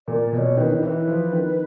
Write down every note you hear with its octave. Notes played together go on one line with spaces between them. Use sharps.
A#2 D5
B2 C#5 D5
D#3 B4
D#3
E3 B4 C#5
F3
D#3